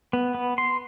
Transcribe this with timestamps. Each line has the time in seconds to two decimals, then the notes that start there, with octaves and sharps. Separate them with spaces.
0.13 B3
0.35 B3
0.58 C6